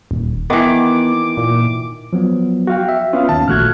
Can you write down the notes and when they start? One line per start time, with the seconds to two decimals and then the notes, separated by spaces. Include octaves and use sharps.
0.11 D#1
0.50 D#3 E3 B3 D6
1.37 A#2
2.13 F3 F#3 B3
2.67 F#4 F5 G5
2.89 E5
3.13 B3 C#4 F4 F5
3.29 D#2 D#3 A5
3.48 A1 A#2 F3 A3 F#4 F6 F#6 G#6